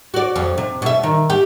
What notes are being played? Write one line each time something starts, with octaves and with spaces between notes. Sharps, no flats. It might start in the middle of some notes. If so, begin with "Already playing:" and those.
F#4 D5
F2
C3
B2 E5
D#3
G4